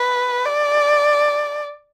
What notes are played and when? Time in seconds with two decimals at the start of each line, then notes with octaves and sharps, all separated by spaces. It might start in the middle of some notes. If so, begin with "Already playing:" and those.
Already playing: B4
0.45 D5